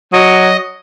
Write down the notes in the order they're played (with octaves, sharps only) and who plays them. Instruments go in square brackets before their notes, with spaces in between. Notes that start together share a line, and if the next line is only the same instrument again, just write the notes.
[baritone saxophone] F#3 [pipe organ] D#5